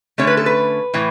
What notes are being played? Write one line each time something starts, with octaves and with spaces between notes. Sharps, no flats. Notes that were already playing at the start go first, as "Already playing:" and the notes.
D3 A3 C#4 C#5
B4
A4
B4
A2 E3